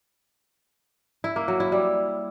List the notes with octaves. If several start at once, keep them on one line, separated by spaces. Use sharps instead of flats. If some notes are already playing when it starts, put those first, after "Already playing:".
E4
A#3
F#3
E4
G3